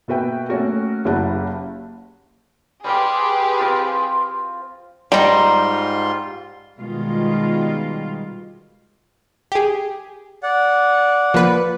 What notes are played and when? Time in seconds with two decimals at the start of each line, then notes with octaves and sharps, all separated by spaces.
0.08 B2 A#3 F#4 B4 E5 G5
0.49 A3 A#3 C#4 F#4 A#4
1.05 F#1 F#3 E4 G4 F#5 A5
2.84 G3 G4 G#4 B4 C5 F5
3.59 F3 C4 F4
5.12 G#2 G3 D#4 F4 A#5 C6
6.79 B2 D#3 G3 G#3 F4
9.52 G4 G#4
10.43 D5 F#5
11.34 F3 A#3 B4